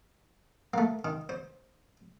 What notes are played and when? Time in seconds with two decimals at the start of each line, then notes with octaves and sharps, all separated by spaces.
0.74 A3 A#3
1.05 D#3
1.29 C5